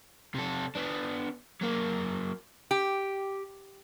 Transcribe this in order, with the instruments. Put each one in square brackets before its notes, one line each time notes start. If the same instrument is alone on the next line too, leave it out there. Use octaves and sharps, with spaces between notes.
[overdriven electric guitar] C3 A4
B3 D4
F#3 A#3
[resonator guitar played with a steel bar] G4